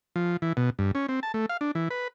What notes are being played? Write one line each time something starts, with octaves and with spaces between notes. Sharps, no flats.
F3
E3
B2
G2
C#4
C4
A5
A3
F5
D4
E3
B4